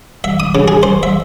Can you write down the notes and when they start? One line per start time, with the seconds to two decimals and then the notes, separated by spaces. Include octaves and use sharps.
0.24 E5
0.40 D#6
0.55 C#3
0.68 G#4
0.83 C5
1.03 E5